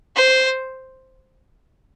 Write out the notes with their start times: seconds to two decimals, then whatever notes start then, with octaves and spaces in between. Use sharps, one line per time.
0.16 C5